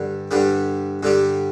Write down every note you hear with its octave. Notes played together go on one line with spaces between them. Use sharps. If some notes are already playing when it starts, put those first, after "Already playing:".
Already playing: G2 D3 G3
G2 D3 G3
G2 D3 G3